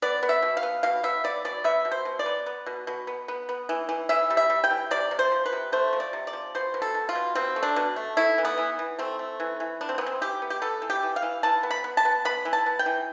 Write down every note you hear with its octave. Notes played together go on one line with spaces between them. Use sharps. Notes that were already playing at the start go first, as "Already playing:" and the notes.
B3 D5
B3
E5
B2
F5
B3
B2 F5
B3 E5
B3 D5
B2 D5
B3 E5
B2
C5
B2
D5
B3
B3
B2
B2
B3
B3
B3
E3
E3
E3 E5
G3
E5
G3
G5
E3
C3 D5
C3
C5
F3
B4
C3
A3 C5
F3
D5
C3
D5
F3
B2 C5
B2
A4
B2
F4
B2
B2 C4
A3
D4
B2
A3
A3 E4
E3
B3
E3
E3
A3 C4
A3
E3
E3
B3 D4
C4
B3
E3
C4
E3 G4
B3
G4
B3 A4
E3
G4
E3
F5
E3
E3 A5
B3
B5
B3
A5
B3
B3 B5
E3
A5
B3
G5
E3